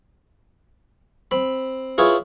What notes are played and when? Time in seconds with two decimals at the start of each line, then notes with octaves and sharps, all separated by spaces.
1.31 C4 B5
1.98 E4 F4 G#4 B4 C#5